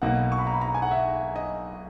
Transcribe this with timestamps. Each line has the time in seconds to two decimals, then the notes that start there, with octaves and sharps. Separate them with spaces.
0.02 B1 B2 A#3 F#5
0.32 C#6
0.39 B5
0.47 A#5
0.53 B5
0.61 A#5
0.74 G#5
0.82 F#5
0.91 E5
1.36 D#5